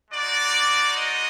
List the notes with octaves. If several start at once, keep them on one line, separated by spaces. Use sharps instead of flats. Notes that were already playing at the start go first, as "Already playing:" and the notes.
G#3 D#4 F#4 D5
D#5